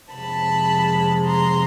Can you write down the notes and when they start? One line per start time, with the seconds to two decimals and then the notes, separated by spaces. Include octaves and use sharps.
0.14 F2 C3 F3 G#3 A5 B5
1.25 A#5 C6